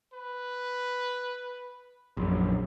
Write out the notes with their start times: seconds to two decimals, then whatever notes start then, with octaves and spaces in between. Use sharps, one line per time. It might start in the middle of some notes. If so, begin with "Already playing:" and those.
0.13 B4
2.17 A#1 F#2